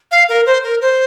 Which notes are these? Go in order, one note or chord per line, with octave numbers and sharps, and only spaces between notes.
F5
A#4
C5
A#4
C5